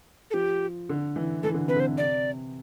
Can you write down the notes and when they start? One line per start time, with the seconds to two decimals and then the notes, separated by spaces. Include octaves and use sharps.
0.31 A4
0.34 F3 G4
0.89 D3
1.16 E3
1.43 E3 A4
1.54 D3
1.66 C3 B4
1.76 D3
1.80 C5
1.98 C3 D5